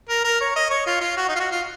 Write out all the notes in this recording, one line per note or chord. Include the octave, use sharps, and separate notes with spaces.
A#4
A#4
C#5
D#5
C#5
F4
F4
F#4
D#4
F4
F#4
F4